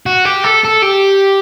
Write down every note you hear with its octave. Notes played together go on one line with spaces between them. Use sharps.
F#4
G4
A4
A4
G4